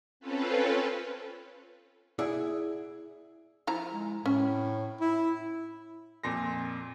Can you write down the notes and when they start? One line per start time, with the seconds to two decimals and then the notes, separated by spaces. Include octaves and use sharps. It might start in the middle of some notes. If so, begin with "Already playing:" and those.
0.20 C4 C#4 F4 A4 B4
2.19 E4 G#4 D5 F#5
3.67 F3 E4 A#5
3.92 G#3
4.26 A2 C#4
5.01 E4
6.24 F2 A#2 C6 A#6